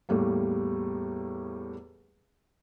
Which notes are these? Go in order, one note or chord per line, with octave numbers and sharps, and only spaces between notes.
E2 A2 G3 A#3